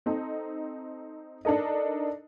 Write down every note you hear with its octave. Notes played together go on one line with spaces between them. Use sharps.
C4 D#4 A4
D4 D#4 A4 A#4 D#5